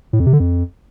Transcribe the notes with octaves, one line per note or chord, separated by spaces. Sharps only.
A2
F2
C3
D3
F2